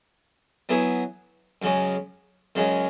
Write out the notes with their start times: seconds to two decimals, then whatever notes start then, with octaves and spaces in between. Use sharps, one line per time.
0.69 F#3 B3 E4 G#4 B4
1.62 F#2 C#3 G#3
2.55 F#2 C#3 G#3